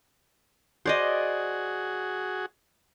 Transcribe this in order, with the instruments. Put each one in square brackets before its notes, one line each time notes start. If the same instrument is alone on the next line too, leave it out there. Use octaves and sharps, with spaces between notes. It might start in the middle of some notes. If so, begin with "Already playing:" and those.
[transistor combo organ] F#4 G#4 [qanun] C5 D5 D#5